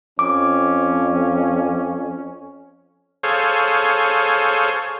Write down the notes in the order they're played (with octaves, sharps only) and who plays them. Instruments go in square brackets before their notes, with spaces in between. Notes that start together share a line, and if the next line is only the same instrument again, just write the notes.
[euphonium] F2 [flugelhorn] C#4 [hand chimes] D6
[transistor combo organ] G#4 A4 C5 C#5 F5